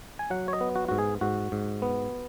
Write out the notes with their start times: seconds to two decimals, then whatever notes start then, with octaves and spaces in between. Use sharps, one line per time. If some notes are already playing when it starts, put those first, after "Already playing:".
0.19 G#5
0.30 F#3 F#5
0.48 C#5
0.53 D#5
0.61 B3
0.75 F#4
0.88 G#2 F#4
0.98 G#4
1.21 G#2 F#4
1.52 G#2
1.82 B3